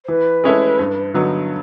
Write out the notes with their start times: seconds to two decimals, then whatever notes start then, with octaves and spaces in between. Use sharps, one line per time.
0.04 C5
0.08 E3 B4
0.44 G#3 C#4 E4 A4
0.79 G2
1.14 D3 F#3 B3 D#4